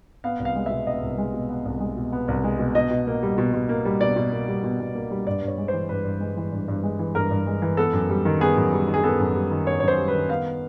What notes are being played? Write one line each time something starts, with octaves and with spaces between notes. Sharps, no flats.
B3 F5
C2
F5
G#3
B2 E5
B3 D#5
C2
G#3
B2
B3
C2
G#3
B2
B3
C2
G#3
B2
B2 D#5
B2
A#3
G3
B2
B2
A#3
G3
B2 D5
B2
A#3
G3
B2
B2
A#3
G3
G2 D5
G2
C#5
G#3
E3 C5
G2 B4
G2
G#3
E3
G2
G2
G#3
E3
G2 A#4
G2
G#3
E3
B3 A4
F#2
G3
D#3
B3 G#4
F#2
G3
D#3
G#4
B3 A4
F#2
G3
D#3
B3 C#5
F#2 C#5
C5
G3
B4
D#3
B3 F5